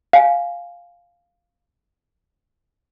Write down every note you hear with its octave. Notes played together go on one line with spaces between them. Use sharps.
F5 G#5